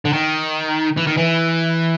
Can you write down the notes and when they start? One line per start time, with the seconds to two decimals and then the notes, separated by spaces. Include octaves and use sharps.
0.05 D3
0.13 D#3
0.97 E3
1.07 D#3
1.17 E3